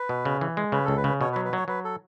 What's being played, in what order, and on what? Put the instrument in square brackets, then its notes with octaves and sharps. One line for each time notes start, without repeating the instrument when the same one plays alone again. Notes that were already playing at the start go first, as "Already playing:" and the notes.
Already playing: [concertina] B4
[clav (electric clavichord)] B2
C#3
E3
G#3
[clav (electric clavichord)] C#3 [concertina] B4
[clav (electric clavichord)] C#2 [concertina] A4
[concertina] B4
[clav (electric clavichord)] C#3
[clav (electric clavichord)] B2 [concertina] C#5
[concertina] B4
[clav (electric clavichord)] F#3
[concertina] B4
[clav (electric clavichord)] F#3 [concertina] C#5
[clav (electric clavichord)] F#3 [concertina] B4
[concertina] A4